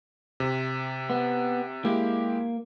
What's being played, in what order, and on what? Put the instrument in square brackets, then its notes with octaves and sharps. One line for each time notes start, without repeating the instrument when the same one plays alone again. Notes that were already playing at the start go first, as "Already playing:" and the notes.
[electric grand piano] C3
[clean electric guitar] B3
[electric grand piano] G#3 E4 G4 [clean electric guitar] A#3